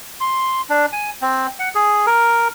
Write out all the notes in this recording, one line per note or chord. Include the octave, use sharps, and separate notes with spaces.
C6
D4
G#5
C4
F#5
G#4
A#4